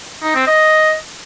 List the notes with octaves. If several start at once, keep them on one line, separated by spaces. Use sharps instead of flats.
D#4
C4
D#5